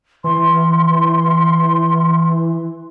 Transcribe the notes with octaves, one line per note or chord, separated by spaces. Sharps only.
E3 C6